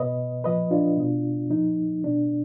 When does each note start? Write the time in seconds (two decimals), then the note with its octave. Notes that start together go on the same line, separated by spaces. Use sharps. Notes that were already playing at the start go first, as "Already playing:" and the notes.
Already playing: B2 B4 D#5
0.44 A#2 F3 B4 D#5
0.71 D4 F4
0.97 B2
1.50 A#2 F3 D#4
2.04 B2 D4